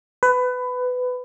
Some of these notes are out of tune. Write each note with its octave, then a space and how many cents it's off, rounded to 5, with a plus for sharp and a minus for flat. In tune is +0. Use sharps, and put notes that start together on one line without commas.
B4 +20